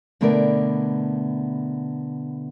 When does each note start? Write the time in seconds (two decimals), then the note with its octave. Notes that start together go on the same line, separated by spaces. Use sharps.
0.21 B2 D3 A3 B3 A#4 D5